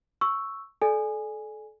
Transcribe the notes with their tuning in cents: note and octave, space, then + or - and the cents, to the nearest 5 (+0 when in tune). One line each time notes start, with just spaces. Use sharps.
C#6 +0 E6 +0
A4 -30 D5 +0 G#5 +0